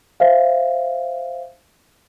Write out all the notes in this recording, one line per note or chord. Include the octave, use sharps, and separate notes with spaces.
C5 E5 F5